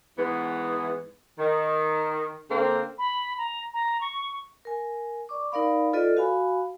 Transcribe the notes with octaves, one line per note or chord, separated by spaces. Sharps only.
G#2 E3 B3
D#3
D3 A#3 C4
B5
A#5
A#5
C#6
A#4 G#5
D5 C#6 D6
D#4 A#4 D5 F5 B5
F4 A4 B4 D5 D#5
F#4 F5 G#5 B5